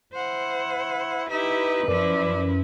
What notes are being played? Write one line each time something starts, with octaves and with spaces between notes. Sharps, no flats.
E4 C5 F#5
D#4 E4 G4 B4
F#2 F3 E4 D5